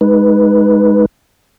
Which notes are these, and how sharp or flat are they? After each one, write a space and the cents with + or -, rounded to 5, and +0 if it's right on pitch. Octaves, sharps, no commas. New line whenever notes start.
G#3 +0 D#4 +0 B4 -5